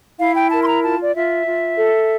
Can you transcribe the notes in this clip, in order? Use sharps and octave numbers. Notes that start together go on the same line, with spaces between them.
E4 F5
G5
A#4 A5
C6
A#5
F4 A5
D5
F4 E5
F4
A4